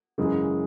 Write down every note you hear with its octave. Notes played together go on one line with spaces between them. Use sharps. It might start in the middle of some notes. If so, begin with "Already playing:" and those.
F#2 C#3 E3 G#3